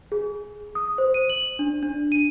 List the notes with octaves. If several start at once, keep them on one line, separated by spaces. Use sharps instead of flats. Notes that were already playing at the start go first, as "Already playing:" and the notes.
G#4
D#6
C5
D#7
F#7
D4
D4
D#7